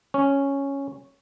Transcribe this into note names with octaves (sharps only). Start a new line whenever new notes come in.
C#4